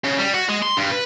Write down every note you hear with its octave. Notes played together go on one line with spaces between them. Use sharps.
C#3
G3
F#4
G#3
C6
G2
B4